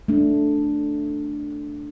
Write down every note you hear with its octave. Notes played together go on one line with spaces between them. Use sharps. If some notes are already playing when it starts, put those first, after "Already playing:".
A3 D4